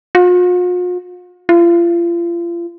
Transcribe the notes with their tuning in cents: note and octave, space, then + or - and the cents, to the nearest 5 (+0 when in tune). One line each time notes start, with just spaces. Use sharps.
F4 +45
F4 -35